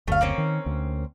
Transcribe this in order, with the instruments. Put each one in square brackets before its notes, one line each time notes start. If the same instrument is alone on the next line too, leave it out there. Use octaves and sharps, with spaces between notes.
[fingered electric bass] F#1 D2 [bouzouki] A3 F5
[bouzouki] A#3 C4 C#4
[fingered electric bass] D#3
D2